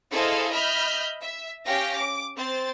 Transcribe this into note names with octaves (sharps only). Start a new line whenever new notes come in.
E4 G#4 A4 C5 D#5 F5
D#5 E5 B5 F6 G6
E5
C#4 G4 F5 G5 A#6
D6
C4 C5 A6